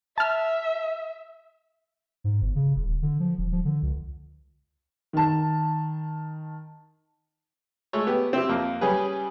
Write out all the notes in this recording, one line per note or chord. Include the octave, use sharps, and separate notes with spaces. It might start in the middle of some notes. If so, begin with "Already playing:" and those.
E5 A5 F6
G#2
G1
C#3
D#1
D3
F3
D#1
F3
D3
C#2
D#3 A5
G#3 A3 C#5
B3 G4
C4 E4 G4
F2 A#3
G3 C#4 G#4 B4